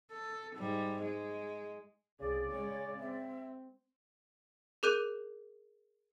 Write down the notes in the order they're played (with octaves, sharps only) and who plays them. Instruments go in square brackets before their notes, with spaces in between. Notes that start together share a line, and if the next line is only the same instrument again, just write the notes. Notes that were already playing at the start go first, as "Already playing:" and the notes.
[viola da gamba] A4
G#2 G3
G#3
[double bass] C2 [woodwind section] C#3 D5 [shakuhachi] G#4
[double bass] G#3 C#4 [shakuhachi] C#5
[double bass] C4 [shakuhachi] E5
[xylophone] G#4 A#4 D6 F#6 G6 D#7